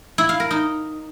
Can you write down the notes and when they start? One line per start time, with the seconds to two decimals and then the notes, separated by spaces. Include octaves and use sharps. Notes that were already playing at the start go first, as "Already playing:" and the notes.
0.18 E4
0.29 F5
0.40 A#4
0.51 D#4